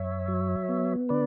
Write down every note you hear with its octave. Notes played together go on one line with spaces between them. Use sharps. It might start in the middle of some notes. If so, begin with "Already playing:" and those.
Already playing: F#2 C#5 E5
F#3
B3
D3 B4 D5